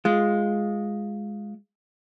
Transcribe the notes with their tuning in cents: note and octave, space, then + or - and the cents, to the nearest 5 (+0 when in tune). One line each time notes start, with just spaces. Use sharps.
G#3 +0 F4 +0